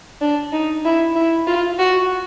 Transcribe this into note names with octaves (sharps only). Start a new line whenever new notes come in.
D4
D#4
E4
E4
F4
F#4